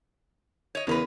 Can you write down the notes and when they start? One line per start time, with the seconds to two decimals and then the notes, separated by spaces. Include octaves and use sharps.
0.75 C#5 D#5
0.87 E2 C#3 A#4 B4